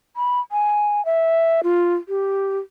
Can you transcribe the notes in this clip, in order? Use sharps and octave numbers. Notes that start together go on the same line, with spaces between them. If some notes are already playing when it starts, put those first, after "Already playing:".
B5
G#5
E5
F4
G4